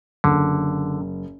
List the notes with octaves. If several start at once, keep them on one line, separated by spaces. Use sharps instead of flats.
F#1 D3